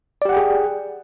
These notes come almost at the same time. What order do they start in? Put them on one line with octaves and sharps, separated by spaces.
D5 G4 F#5 G5 G#4